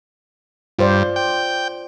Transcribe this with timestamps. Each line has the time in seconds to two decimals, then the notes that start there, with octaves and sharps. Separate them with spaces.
0.79 G2 F4 C5 D5
1.16 G5